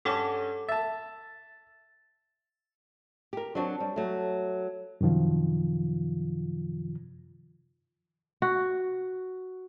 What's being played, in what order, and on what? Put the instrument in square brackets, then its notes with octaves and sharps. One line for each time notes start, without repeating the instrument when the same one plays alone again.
[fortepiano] G2 C#4 A5 [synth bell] A4 F#5 D6
[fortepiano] E5 A5 [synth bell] A6
[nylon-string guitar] G4 A#4
F#3 C4 D4 F#4
G3
F#3 A3
[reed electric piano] F#2 C3 D#3 F3 F4
[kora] F#4